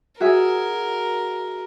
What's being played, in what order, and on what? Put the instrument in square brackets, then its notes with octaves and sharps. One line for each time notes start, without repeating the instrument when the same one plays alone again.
[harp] F#4 G#4 E5 [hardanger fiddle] A#4